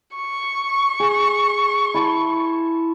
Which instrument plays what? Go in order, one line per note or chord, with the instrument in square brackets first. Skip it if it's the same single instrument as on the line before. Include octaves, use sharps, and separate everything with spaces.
[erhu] C#6
[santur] G#4
E4 A5 C6